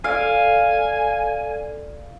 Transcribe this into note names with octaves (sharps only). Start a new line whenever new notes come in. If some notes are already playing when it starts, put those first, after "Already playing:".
A4 D5 F5 G#5